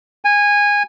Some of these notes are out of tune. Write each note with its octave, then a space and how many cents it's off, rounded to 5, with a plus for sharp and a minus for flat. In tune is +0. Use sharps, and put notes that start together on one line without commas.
G#5 -15